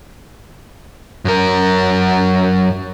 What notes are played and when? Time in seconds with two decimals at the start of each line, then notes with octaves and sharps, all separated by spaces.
1.25 F#2 A#4